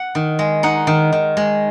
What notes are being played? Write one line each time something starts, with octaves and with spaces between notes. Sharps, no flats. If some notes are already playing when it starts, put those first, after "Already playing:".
Already playing: F#5
D#3
G#3
D#4 F#5
D#3
D#3
G#3